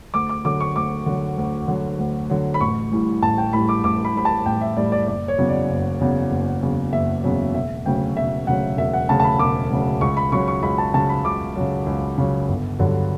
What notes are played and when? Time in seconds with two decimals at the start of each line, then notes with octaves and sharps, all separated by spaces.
0.14 D2 D6
0.29 D6
0.44 D3 F#3 D6
0.60 C#6
0.76 D2 D6
1.06 D3 F#3
1.37 D2
1.68 D3 F#3
1.99 D2
2.30 D3 F#3
2.54 B5
2.61 A1 C#6
2.91 A2 E3 G3
3.23 A1 A5
3.38 G5
3.53 A2 E3 G3 B5
3.69 D6
3.84 A1 D6
4.05 B5
4.15 A2 E3 G3 B5
4.25 A5
4.46 A1 G5
4.61 E5
4.77 A2 E3 G3 D5
4.92 D5
5.08 F#1 D5
5.28 C#5
5.38 E2 C#3 F#3
5.49 D5
5.69 F#1
6.00 E2 C#3 F#3
6.31 F#1
6.62 E2 C#3 F#3
6.93 F#1 E5
7.24 E2 C#3 F#3
7.54 E1 E5
7.86 D2 C#3 F#3 G5
8.16 E1 E5
8.47 D2 C#3 F#3 F#5
8.78 E1 E5
8.93 F#5
9.09 D2 C#3 F#3 A5
9.20 A5
9.24 B5
9.39 E1 D6
9.70 D2 C#3 F#3
10.01 C#2 C#6
10.17 B5
10.32 C#3 F#3 C#6
10.48 C#6
10.63 C#2 B5
10.78 A5
10.94 C#3 F#3 A5
11.09 B5
11.24 C#2 D6
11.56 C#3 F#3
11.86 C#2
12.18 C#3 F#3
12.48 G1
12.79 G2 D3 F#3